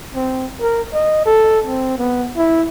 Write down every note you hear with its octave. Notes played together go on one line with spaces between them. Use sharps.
C4
A#4
D#5
A4
C4
B3
E4